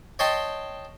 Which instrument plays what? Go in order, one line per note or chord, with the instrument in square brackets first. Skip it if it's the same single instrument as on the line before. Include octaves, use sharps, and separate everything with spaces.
[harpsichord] C#5 D#5 G5 A5 C6